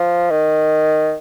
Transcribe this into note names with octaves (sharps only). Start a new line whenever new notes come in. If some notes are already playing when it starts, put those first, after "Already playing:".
Already playing: F3
D#3